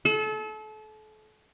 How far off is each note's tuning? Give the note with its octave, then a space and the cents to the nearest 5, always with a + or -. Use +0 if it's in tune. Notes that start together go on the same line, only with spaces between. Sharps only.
A4 -35